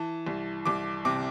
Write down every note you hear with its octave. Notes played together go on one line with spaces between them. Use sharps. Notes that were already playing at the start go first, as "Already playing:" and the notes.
Already playing: E3 A5
C2
C2 D6
C3 D6